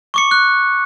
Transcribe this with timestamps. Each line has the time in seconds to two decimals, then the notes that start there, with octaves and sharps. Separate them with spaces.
0.14 C#6 D6 C#7
0.31 F#6